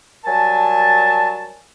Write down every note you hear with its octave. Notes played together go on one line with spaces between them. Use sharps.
F#3 G3 A#4 G#5 A5